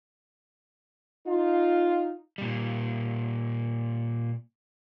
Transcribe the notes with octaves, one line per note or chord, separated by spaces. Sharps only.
D#4 F4
A#2 G3